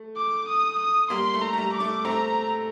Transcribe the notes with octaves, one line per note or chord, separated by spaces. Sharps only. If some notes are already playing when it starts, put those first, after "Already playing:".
Already playing: A3
D6
D#6
D#6
G3 A#3 C6
A3
A#5
A3
G3
D6
A3
A3 C4 A#5